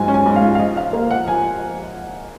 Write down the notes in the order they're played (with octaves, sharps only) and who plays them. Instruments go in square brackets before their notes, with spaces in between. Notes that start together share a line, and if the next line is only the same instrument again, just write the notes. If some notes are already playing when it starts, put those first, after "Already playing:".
Already playing: [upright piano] G#2 F#3 F4 G#5
C#4
G#5
G#2
F5
F4
F5
F3 D#5
F3 F5
A#3
F3 F#5
F3 G#5